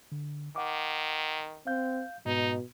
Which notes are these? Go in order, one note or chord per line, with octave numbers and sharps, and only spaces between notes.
D3
D#3 F#5 D6
C4 F5 G6
G#2 B2 D#4